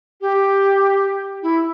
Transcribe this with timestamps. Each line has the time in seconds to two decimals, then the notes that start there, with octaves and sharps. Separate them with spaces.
0.21 G4
1.43 E4